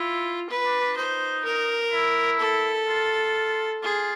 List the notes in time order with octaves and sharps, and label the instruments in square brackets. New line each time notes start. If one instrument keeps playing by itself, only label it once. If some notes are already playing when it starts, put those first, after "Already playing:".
Already playing: [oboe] E4 [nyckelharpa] F4
[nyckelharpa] B4
[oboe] D4
D4
[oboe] D#4 [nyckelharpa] C5
[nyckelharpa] A#4
[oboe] E4
[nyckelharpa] A4
[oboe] F4
[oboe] F4 [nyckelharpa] G#4